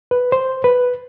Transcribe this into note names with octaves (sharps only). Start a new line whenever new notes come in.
B4
C5
B4